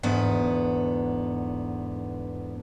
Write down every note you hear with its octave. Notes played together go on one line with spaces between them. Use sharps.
E2 G#2 D3 B3